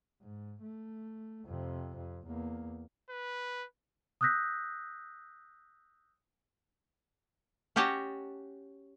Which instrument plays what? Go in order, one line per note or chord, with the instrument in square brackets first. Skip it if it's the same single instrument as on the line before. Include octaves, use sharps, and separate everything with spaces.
[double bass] G#2
A3
F2 C3
F2
E2 A#3
[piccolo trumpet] B4
[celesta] D#6 E6 F#6 G6 A#6 B6
[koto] C#4 F#4 G4 C#5 D#5 A5